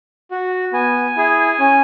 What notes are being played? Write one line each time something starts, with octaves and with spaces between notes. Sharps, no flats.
F#4
B3 G#5
E4 G#4
C#4